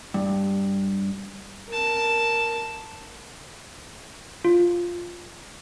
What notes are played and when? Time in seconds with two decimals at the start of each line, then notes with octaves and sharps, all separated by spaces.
0.14 G2
1.68 A#4 A5
4.45 F4